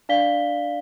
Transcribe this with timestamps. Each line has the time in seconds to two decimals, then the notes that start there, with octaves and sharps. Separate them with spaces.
0.09 D4 D5 F5 B6 G7